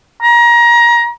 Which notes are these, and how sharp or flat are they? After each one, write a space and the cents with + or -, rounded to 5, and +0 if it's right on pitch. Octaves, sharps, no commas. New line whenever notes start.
A#5 +25